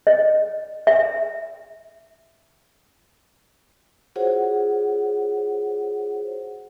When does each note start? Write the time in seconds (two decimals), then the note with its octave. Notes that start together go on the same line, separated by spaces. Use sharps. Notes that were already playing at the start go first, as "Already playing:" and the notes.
0.07 D#5
0.87 E5
4.16 F4 F#4 G#4 C5 C#5 F#5